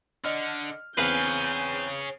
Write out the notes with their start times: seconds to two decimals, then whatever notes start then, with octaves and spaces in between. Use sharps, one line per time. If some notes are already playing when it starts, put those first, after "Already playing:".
0.25 D3 D5 D#5 F6
0.97 E2 C4 G#4 B4 C#5 F5 G6 D#7